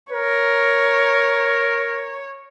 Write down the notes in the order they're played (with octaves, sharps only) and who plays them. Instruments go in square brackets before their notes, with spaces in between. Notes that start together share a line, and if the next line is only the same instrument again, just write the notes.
[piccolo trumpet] A#4 [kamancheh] C#5